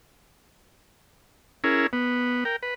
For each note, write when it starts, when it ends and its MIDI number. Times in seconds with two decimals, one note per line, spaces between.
1.64 1.87 61
1.64 1.87 64
1.64 1.87 68
1.64 1.87 70
1.93 2.44 59
2.45 2.56 70
2.45 2.56 79
2.63 2.74 71